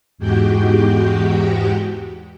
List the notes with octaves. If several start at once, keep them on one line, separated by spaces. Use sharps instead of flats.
E2 G#2 G#3 F#4 G4 G5